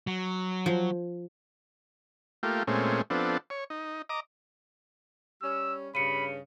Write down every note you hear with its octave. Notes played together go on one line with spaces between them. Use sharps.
F#3
F3
A3 A#3 F4 G4
A#2 G#3 A3 C4 C#4
F3 B3 C4 D4 A4
C#5
D#4
D#5 A#5 D6
G3 C#4 E6
G2 C#3 B5 C#7 D#7